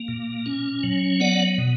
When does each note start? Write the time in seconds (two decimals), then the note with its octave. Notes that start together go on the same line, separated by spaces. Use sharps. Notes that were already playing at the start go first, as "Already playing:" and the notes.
Already playing: A#3
0.08 A#2
0.46 C#4
0.83 F#3
1.20 B3 D5 F#5
1.58 B2